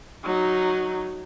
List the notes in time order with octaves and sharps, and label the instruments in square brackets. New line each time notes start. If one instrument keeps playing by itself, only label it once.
[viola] F#3 D#4